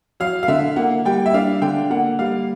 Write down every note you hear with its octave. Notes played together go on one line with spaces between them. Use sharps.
F#3 F5
F5
D3 E5
A#3 F#5
G3 G5
E5
D4 F5
D3 G5
A#3 F#5
G3 F5